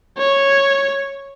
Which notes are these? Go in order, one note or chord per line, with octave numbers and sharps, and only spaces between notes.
C#5